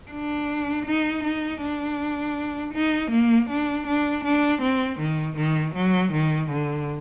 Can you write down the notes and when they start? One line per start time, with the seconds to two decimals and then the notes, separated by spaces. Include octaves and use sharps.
0.11 D4
0.86 D#4
1.24 D#4
1.61 D4
2.74 D#4
3.11 A#3
3.50 D4
3.87 D4
4.24 D4
4.62 C4
4.99 D#3
5.37 D#3
5.75 F#3
6.13 D#3
6.50 D3